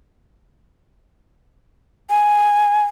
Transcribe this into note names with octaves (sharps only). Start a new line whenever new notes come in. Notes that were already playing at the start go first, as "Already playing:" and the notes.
G#5